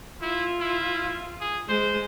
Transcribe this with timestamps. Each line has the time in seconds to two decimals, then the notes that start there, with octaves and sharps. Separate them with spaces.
0.22 E4 F4
0.60 E4
1.41 G#4
1.69 G#3 C5